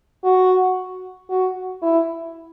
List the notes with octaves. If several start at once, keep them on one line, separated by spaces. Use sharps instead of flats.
F#4
F#4
E4